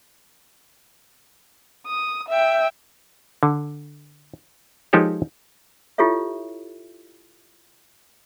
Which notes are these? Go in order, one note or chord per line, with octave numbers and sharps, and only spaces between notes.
D#6
E5 G5
D3
F3 G#3 D#4 G4 A4 C#5
E4 F4 G4 A4 C#5 E5